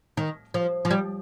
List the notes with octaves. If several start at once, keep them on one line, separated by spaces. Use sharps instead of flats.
D#3
F3
F3
G3